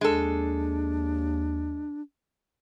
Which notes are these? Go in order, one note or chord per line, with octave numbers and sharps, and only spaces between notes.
D#2 G#3 D4 A4